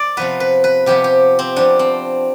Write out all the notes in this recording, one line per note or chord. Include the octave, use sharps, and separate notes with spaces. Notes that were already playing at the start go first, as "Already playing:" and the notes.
Already playing: D5
C3 F3 B3 B4
B4
B4
C3 F3 B3 G4
G4
C4
C3 F3 B3 D4
C4